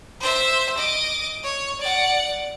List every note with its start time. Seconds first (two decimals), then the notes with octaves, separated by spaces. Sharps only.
0.20 C5 E5
0.77 D#5 D6
1.43 C#5
1.80 D5 F#5